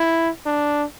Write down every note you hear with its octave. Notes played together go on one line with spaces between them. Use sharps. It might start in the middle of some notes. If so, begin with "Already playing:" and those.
Already playing: E4
D4